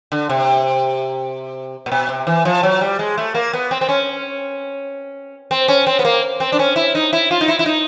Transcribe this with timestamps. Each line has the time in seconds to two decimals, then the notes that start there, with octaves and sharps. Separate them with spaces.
0.12 D3
0.29 C3
1.86 A#2
1.92 B2
2.09 C3
2.27 E3
2.45 F3
2.63 F#3
2.81 G3
2.99 G#3
3.18 A3
3.34 A#3
3.53 B3
3.71 C4
3.81 C4
3.89 C#4
5.51 C4
5.68 C#4
5.87 C4
5.99 B3
6.05 A#3
6.40 C4
6.52 D4
6.59 C#4
6.76 E4
6.95 D#4
7.13 E4
7.31 F4
7.41 D#4
7.48 E4
7.59 E4
7.66 D#4